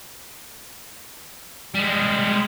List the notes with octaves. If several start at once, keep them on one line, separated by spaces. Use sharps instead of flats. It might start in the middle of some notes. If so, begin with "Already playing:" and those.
G3 G#3